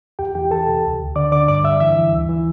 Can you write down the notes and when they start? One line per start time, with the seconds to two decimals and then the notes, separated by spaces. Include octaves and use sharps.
0.19 E2 G4 G5
0.35 E3 G4 G5
0.51 E2 A4 A5
0.68 C3
0.84 D2
1.00 D2
1.16 D3 D5 D6
1.32 D3 D5 D6
1.48 G2 D5 D6
1.64 G2 E5 E6
1.80 E3 E5 E6
1.96 E3
2.13 D2
2.29 E3